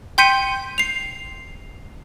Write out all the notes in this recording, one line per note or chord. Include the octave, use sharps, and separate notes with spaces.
G5 C6 G6 B6 C#7 D#7
C7 F7